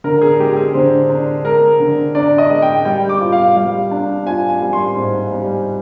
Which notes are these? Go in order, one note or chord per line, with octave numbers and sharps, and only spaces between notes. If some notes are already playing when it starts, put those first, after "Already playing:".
D3 A#4
G#4
G#3 G4
G#4
D3 C5
D4
G#3 A#4
D3
D4 D5
D#5
G#3
G5
G3 G5
D6
F4
F5
G3 F5
D4
F4 G#5
G#5
G3
C6
G#2
G3